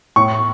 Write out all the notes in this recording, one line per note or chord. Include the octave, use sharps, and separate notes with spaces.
A2 C#6